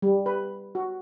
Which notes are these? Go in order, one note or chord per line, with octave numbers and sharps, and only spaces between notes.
G3
B4
F#4